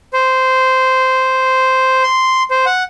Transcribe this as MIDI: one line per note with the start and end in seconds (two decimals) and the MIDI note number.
0.13 2.03 72
2.03 2.43 84
2.50 2.65 72
2.66 2.83 78